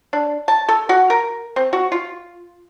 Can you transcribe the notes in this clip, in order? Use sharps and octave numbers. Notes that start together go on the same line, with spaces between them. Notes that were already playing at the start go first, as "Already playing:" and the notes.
D4
A5
A4
F#4
A#4
C4
F#4
F4